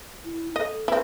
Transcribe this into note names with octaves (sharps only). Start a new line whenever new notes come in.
E4
A4 D#5
C4 E4 B4